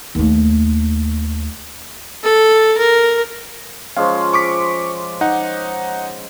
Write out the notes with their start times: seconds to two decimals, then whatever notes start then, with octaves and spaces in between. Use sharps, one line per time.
0.15 D#2 A3
2.23 A4
2.78 A#4
3.97 F3 G#3 C#4 F5
4.33 C#6 D6 B6
5.21 D#4 F#5